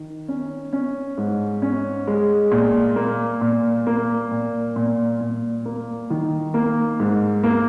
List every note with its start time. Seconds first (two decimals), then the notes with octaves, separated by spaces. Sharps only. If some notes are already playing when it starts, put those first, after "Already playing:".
Already playing: D#3
0.28 C#4
0.73 C#4
1.18 G#2
1.62 C#4
2.07 G#3
2.51 A#2
2.96 A#3
3.41 A#2
3.87 A#3
4.31 A#2
4.76 A#2
5.20 A#2
5.65 A#3
6.10 D#3
6.54 A#3
7.00 G#2
7.44 A#3